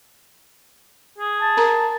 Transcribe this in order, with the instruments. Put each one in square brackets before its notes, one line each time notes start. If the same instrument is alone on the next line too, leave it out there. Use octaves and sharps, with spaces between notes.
[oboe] G#4
[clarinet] A5
[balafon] A#4 A#5